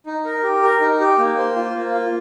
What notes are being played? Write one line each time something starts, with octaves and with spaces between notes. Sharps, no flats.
D#4
A#4
G4
A#4
D#4
G4
A#3
C5
F4
A#3
F4